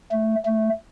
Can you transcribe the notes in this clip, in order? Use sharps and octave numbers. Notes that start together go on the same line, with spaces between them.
A3
A3